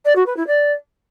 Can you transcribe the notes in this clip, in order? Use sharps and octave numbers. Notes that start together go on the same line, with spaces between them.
D5
F#4
B4
E4
D5